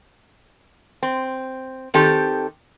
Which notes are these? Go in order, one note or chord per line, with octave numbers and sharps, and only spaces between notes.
C4
D#3 C4 G4 A4